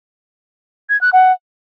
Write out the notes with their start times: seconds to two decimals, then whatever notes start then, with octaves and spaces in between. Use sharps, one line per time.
0.89 G#6
1.01 F#6
1.13 F#5